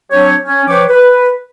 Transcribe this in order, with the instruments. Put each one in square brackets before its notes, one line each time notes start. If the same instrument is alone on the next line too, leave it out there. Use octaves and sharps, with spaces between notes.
[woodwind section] F#3 C4 D4 G4 C#5
C#4
F3 B4 C#5 G5 C#6 D6
B4